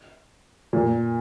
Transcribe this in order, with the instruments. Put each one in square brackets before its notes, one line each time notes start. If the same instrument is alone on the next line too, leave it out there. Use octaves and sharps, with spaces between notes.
[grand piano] A#2